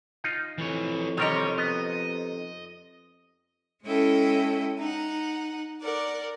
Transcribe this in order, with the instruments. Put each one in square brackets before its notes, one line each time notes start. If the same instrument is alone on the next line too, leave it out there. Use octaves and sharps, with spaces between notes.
[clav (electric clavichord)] D#4 F4
[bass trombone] F2 [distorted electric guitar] E3 C#5
[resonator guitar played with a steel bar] C3 C4 D#4 [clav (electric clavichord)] D#3 G3 A#4 [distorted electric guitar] C#5
[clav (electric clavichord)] B3 [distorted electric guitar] D#5
[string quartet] G#3 C#4 E4 A4 D#5 G5
D#4 F#5
A#4 D5 F#5